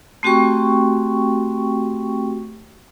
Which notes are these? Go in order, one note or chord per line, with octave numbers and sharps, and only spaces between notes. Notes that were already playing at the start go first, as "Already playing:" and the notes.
A3 C4 F#4 G4 G5 C#6